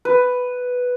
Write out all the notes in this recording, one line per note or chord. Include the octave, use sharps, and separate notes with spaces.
B4